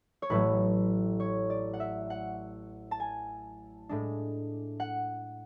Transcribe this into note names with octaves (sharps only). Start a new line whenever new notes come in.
C#5
A1 A2 F#3 A3 B4
C#5
D5
F#5
E5
F#5
A5
G#5
A2 G#3 D4
F#5